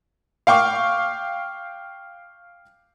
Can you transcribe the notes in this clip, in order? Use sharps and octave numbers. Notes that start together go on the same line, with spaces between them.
F5 G5 C#6 D6